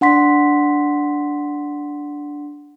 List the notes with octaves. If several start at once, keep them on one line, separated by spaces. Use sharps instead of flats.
D4 F#5 C6 B6